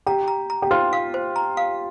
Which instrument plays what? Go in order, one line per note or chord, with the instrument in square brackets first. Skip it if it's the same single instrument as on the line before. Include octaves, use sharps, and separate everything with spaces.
[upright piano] G4 [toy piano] A#5
[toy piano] A#5
A#5
[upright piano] G4
[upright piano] F4 [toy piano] C5
[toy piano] F5
C5
A#5
F5